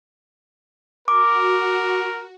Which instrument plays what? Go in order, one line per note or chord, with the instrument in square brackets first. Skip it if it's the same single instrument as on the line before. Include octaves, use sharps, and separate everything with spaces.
[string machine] F#4 [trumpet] A#4 [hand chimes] D6